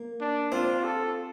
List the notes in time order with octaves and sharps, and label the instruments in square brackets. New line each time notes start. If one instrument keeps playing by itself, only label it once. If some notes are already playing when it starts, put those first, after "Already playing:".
Already playing: [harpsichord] A#3
[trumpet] D4
[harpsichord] C4 [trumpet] F4
[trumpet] A4